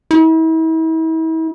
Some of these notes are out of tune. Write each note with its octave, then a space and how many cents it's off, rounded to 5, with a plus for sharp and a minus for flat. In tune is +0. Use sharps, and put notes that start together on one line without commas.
E4 -40